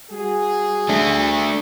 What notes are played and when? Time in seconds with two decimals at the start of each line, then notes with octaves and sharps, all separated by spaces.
0.11 G3 F#4 G#4
0.89 A3 D4